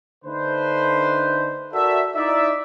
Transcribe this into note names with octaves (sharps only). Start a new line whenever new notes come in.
D3 A3 D4 D#4 B4 C5
F#4 A4 A#4 D5 E5
D#4 E4 D5 E5